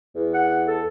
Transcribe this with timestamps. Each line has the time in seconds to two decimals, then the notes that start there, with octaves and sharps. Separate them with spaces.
0.15 E2
0.34 F#5
0.67 A4